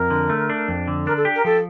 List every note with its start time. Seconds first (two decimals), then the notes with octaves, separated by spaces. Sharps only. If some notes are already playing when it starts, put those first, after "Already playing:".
Already playing: F2 A#4
0.10 D3
0.30 A3
0.50 D4
0.68 F2
0.88 D3
1.06 D4 A#4
1.16 A4
1.25 G4
1.35 A#4
1.45 F3 A4